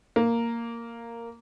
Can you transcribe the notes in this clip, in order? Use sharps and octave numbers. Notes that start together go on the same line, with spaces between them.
A#3